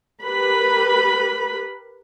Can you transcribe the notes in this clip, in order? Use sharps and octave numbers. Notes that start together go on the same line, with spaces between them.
G4 A#4 B4 B5